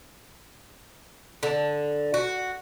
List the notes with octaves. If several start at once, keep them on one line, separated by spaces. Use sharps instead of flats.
D3
F#4